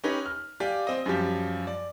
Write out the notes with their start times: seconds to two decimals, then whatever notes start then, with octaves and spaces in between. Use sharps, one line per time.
0.04 C#4 D#4 G4 B4 C#5
0.26 F6
0.60 G4 D5 F5 G#5
0.87 C4 D#5
1.06 F#2 F3 G3 G4
1.67 D5